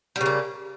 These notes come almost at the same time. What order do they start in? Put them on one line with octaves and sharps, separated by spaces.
G3 C#3 A#3